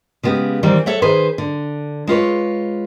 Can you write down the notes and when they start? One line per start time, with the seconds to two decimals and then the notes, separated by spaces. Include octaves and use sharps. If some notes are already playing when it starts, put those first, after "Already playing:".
0.23 C#3 G#3 B3 G4
0.63 D#3 E3 G3 C4
0.86 A4 C#5 E5 F#5
1.02 D#3 G#4 B4 C5
1.38 D3
2.07 G#3 F4 B4 C#5